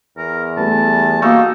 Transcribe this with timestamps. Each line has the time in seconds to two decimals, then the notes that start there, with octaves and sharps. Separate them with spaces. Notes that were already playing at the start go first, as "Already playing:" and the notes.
0.18 E2 A#4
0.57 G3 A3 B3 A5
1.22 A#3 D#4 F#4 C#6 E6